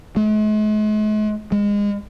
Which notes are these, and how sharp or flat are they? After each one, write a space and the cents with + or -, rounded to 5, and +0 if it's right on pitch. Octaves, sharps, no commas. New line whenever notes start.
G#3 +45
G#3 -25